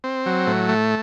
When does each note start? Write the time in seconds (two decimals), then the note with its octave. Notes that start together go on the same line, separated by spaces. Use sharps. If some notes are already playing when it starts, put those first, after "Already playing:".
0.04 C4
0.26 F#3
0.47 A2
0.69 A3